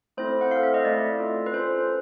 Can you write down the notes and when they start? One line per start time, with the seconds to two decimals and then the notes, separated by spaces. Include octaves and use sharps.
0.17 A3 C4 E4 A4 C5
0.41 F#5
0.51 A3 C4 E4 A4 F5
0.63 E5
0.74 D#5
0.85 A3 C4 E4 A4 D5
1.19 C#4 F4 A4
1.46 B4
1.53 C#4 F4 A4 C5